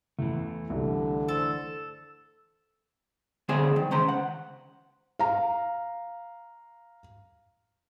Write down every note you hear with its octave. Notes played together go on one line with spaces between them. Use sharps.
E2 E3 A3
C2 D3
A4 C5
D3 B3 G#4 C5 G#5
D#3
C#2 C#3 C5 A#5
F#5
F5 A#5